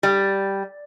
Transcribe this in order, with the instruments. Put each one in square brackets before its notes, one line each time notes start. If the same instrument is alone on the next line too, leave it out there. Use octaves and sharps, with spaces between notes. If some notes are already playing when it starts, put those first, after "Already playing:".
[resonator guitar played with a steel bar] G3